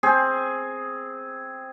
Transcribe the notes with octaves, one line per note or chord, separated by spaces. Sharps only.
C4 G#4